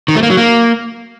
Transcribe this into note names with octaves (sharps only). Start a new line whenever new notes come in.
D#3
A3
A#3
F#3
A#3